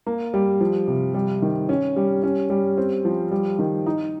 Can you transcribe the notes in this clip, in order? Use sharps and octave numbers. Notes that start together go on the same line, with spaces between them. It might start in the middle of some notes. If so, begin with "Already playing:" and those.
A#3
G3
F3
C3
G3
D#3
C#4
G3
C#4
G3
C4
F3
G3
D#3
D#4